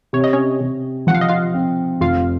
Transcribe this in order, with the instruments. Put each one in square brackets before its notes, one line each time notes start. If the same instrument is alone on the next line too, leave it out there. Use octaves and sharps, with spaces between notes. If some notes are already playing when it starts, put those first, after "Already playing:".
[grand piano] C3 [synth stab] C#5
[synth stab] D#5
C#4 C#5
[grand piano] C3
[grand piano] F3 [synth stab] F#5
[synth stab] F5
D#5
F4 F5
[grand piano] C4
[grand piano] F1 [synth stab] F4 F5